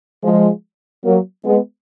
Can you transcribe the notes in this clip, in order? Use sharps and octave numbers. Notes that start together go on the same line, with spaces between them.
F3 G#3
F#3 A#3
G#3 B3